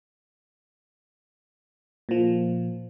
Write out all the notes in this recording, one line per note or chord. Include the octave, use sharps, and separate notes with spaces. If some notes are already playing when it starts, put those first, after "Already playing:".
A#2 F3